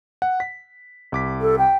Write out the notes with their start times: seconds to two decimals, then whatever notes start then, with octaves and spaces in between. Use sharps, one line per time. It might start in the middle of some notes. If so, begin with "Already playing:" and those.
0.22 F#5
0.40 B6
1.12 C2 D6 B6
1.41 A4
1.58 G5